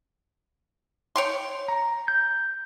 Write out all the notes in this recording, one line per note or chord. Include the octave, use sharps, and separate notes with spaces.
C#5 G5 C6
A#5
G6